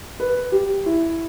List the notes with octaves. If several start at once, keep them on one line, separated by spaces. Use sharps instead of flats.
B4
G4
E4